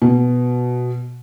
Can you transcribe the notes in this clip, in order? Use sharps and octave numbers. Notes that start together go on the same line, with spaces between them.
B2